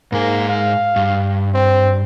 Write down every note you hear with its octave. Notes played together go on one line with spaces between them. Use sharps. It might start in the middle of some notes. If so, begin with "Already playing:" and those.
G#2 A#3 G#4
F5
G2
C4